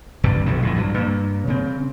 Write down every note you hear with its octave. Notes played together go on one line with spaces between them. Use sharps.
G1 G2 C3 G3
B1 F2 A2 C#3
A#1 A2 E3
G2 F#3
G2 A#3
C#3 C4